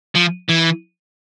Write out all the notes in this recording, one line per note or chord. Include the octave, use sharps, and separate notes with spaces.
F3
E3